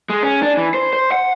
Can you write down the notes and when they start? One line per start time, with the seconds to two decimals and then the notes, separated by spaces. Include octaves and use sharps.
0.10 G#3
0.23 C#4
0.42 D4
0.57 E3
0.74 C5
0.93 C5
1.12 F#5